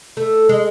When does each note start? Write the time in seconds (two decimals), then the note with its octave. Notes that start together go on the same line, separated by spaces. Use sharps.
0.17 A3
0.49 G#3